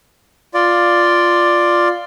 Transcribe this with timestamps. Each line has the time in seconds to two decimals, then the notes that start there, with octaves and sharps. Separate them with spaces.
0.54 F4 D5